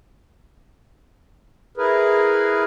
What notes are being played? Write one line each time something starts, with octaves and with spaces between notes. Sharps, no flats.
E4 G#4 A#4 B4